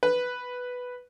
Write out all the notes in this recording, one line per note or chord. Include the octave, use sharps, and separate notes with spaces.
B4